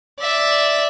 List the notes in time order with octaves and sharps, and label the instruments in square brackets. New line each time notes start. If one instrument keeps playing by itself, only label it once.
[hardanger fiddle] D5 E5